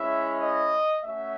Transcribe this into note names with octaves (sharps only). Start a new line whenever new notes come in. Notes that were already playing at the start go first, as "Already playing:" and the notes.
Already playing: G#3 C#4 E4 E5
D#5
A3 C#4 F#4 E5